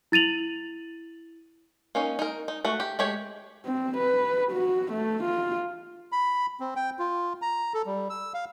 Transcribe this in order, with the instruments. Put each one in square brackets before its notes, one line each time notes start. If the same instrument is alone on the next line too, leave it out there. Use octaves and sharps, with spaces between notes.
[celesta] E4 A6 D#7 F7 F#7
[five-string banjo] A#3 C#4 D#4
D#4 A#4
D#4
A3 F#4
G4
G#3 A3 G4 C#5
[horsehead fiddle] C4
B4
F#4
A3
F4
[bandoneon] B5
C4
G5
F4
A#5
A4
G3
E6
F5